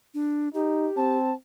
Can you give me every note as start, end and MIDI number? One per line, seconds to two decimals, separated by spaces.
0.14 0.49 62
0.54 0.87 63
0.54 1.18 67
0.97 1.33 60
0.97 1.34 81